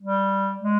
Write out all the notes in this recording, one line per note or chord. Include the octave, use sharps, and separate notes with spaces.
G3
G#3